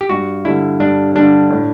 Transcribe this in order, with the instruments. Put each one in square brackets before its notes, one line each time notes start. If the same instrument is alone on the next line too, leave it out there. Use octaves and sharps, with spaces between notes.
[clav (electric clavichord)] G4
[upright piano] G2 [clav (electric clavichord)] F#4
[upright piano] D3 G3 [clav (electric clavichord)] E4
[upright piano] G2 [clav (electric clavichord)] D4
[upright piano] D3 G3 [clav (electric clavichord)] D4
[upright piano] A2